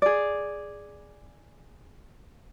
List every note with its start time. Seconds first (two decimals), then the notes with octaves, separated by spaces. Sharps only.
0.02 G#4 D5